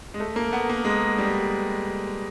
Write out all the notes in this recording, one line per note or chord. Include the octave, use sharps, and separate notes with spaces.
G#3
A3
A#3
B3
A#3
G#3
G3